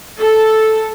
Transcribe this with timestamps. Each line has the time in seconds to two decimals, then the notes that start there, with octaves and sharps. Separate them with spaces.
0.20 A4